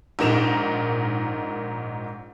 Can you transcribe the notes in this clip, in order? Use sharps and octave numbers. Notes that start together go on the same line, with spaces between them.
A#1 G#2 D#4 A#4 E7 F7